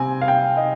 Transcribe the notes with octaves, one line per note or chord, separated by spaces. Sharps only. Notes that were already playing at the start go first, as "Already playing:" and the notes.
Already playing: C3 C4 G#5
F5
G5
D#5